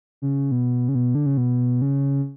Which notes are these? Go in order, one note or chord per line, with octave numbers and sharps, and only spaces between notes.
C#3
B2
C#3
B2
D3
C#3
B2
C#3